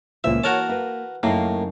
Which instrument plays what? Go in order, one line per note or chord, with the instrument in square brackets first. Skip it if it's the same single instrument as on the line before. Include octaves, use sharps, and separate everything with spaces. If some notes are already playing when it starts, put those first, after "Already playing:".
[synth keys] C#2 A#2 F3 [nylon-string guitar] E3 A#3 [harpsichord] E5
[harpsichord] F#4 A#4 A5 [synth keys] C#5
[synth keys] A#3 [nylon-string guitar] B4 E5
[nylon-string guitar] F#2 C#3 D#4 [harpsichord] A2 [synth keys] A#3